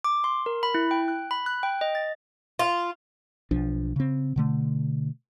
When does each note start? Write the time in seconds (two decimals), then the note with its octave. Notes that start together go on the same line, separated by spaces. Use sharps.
0.04 D6
0.24 C6
0.46 A#4
0.63 B5
0.75 E4
0.91 G5
1.08 F#6
1.31 B5
1.46 F#6
1.63 G5
1.81 D#5
1.95 A6
2.59 F4
3.51 B1 F3 D4
3.96 C#3 C4
4.36 B2 D3 A3